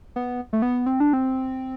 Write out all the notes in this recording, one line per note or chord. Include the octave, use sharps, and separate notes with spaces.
B3
A3
B3
C4
D4
C4